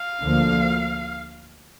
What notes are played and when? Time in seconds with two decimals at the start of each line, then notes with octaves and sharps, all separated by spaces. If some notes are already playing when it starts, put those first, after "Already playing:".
Already playing: F5
0.23 D2 D3 F3 A#3